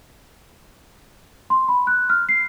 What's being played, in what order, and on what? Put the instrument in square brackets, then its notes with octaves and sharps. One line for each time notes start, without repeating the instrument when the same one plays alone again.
[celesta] C6
B5
F#6
F6
C7